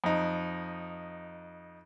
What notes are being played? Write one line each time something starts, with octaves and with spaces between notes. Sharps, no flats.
F2 D#4